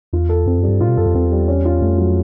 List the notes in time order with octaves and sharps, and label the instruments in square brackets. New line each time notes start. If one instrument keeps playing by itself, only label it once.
[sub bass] E2 [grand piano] F4
[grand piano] A4
[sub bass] F2 [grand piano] C4
[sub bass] F#2 [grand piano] G3
[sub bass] G2
[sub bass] A2 [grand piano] F4
[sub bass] B2
[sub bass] F#2 [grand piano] A4
[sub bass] F2
[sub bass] E2 [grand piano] C4
[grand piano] G3
C#4
F4
[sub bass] F2 [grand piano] A3
[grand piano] F#3